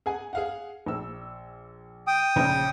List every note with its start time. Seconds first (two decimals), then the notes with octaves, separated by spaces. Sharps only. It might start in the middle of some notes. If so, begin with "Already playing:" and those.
0.06 G#4 F#5 G#5
0.33 G#4 F5 F#5
0.87 A#1 E6
2.07 G5 D#6
2.36 A#1 C#3